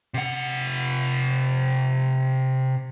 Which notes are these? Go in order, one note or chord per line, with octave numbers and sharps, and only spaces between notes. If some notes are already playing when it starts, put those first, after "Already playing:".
C3 F#5